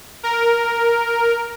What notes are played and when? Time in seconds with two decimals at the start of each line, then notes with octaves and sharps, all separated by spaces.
0.23 A#4